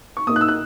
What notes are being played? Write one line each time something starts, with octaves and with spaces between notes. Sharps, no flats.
C#6
A#2 A#3 D#4 D#6
F#6
E6
F#6